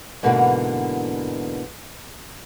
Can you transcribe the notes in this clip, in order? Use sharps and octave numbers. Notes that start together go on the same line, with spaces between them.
G#2 B2 D3 E3 G3 A#3